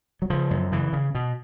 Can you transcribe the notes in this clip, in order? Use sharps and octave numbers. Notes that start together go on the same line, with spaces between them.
F#3
C#3 F3
F#2
C#3 E3
C#3
B2